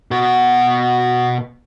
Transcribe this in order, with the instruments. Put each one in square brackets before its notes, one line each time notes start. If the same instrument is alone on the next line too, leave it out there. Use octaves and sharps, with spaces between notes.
[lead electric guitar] B2 F#4